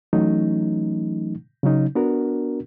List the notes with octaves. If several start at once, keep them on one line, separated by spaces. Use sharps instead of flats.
E3 F#3 A3 C#4 D#4
C#3 F#3 C#4 D#4
B3 D4 F#4 A#4